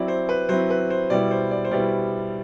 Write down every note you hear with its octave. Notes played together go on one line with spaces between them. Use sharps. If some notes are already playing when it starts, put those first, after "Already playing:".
Already playing: F#3 C4 E4 D5
C5
B4
F#3 C4 E4 C5
B4
C5
B2 G3 B3 E4 D5
C5
D5
C5
B2 G3 B3 E4 D5